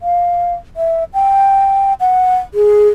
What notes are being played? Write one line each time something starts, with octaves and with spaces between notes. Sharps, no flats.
F5
E5
G5
F#5
G#4